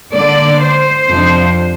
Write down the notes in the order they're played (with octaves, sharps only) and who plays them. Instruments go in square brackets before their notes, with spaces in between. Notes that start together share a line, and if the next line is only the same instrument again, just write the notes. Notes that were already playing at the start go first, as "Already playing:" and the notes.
[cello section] D3 A#3 D4 D5
C5
F2 C3 F3 D4